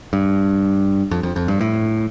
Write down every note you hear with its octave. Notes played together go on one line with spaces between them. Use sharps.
G2
F2
F2
F2
G2
A2